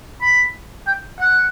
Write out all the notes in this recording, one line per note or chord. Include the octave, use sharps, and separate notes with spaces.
B5
G5
F#5